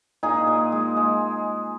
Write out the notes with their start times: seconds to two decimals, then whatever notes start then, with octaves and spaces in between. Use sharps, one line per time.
0.23 A#2 D#4 G#4
0.47 A#2
0.72 G#3
0.97 G#3